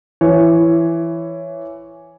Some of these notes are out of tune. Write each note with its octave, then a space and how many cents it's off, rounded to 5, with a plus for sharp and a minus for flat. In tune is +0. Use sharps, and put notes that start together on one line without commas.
E3 +15 C#5 +0